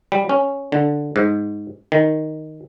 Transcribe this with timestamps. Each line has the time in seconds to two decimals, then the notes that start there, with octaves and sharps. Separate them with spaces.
0.12 G3
0.29 C#4
0.72 D3
1.16 G#2
1.92 D#3